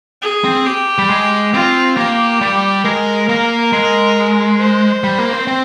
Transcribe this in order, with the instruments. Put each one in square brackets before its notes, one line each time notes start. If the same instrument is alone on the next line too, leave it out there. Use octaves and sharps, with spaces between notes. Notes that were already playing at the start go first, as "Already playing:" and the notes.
[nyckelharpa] G#4
[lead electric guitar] C4
[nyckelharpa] G4
[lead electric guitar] G3
G#3
[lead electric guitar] C4 [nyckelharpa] F4
[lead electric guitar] A#3 [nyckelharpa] G4
[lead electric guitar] G3
[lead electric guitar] G#3 [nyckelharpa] A#4
[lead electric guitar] A#3 [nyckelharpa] A#4
[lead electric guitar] G#3
[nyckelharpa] C5
[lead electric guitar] G3
A#3
C4
C4